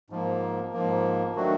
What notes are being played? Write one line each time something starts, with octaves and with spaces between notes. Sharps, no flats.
G#2 F3 A#3
G#2 F3 A#3
D#3 F#3 A3 D4 F#4